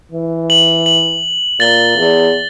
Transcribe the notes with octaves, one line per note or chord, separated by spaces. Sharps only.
E3
F#7
F#7
A#2 A6 G7
E2